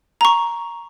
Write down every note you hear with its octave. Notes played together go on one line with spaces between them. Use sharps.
A#5 C#6